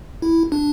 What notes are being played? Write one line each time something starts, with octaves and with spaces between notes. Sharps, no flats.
E4
D4